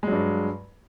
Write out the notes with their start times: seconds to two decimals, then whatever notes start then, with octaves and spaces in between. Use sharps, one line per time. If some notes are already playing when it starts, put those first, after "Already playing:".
0.03 G#3
0.07 F#3
0.12 G2